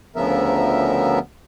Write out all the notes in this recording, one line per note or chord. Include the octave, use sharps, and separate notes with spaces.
D2 C#3 F3 B3 A#4 E5